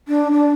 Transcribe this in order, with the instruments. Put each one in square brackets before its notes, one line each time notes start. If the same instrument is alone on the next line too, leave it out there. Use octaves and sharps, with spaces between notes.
[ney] D4
D4